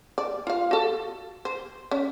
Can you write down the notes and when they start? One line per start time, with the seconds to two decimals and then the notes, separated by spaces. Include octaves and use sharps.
0.18 D5
0.47 F4 F5
0.71 F#4 A4
1.45 C5
1.91 C#4